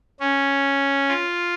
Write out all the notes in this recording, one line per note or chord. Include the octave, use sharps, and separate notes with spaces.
C#4
F4